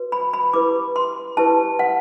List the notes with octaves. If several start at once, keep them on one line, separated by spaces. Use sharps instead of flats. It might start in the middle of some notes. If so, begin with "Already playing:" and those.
Already playing: F#4 B4
B5
B5
E4 G4 B4 D6
C6
E4 G4 B4 A5
F#5